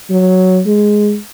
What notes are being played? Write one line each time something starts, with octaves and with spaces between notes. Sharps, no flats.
F#3
G#3